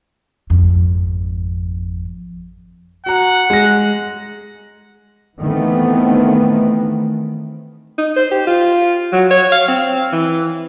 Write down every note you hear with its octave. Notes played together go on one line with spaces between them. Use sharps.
G#1 F2
F#4 F#5 A#5
G#3 A#6
D#3 E3 A3 B3 C4
D#4
C5
G4
F4
F#3
C#5
F5
C4
E3